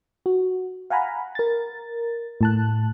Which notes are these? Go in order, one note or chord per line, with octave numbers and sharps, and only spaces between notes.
F#4
F5 F#5 G#5 A#5 B5
A#4 A6
A2 A5 F#6